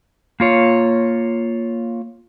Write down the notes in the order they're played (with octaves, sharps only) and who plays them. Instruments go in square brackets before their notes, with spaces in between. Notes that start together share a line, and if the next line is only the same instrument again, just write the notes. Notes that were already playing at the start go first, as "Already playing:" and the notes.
[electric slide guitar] A#3 F4 C#5